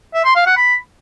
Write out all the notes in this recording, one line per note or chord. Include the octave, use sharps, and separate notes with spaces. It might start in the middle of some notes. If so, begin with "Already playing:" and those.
E5
C6
F5
F#5
B5